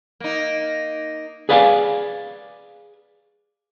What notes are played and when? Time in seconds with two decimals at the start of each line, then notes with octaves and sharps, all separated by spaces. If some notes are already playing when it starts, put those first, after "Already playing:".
0.20 A#3 D#4
1.49 G#4 B4 D5 F5 G5 G#5